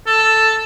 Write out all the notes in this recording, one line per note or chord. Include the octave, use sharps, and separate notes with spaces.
A4